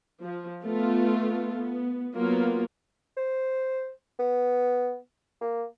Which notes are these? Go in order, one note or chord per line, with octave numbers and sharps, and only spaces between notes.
F3
A3 B3 F4
B3
F#3 A#3 B3 F4
C5
B3
A#3